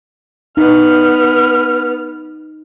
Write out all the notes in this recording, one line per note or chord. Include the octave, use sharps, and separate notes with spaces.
B3 D#4 F6